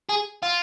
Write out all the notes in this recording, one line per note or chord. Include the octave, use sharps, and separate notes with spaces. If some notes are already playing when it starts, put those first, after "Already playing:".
G#4
F4